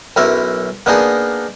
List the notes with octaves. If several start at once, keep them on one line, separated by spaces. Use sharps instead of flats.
B1 F#2 E4 A#4 E5
A#3 B3 D4 D#4 G#4 A#4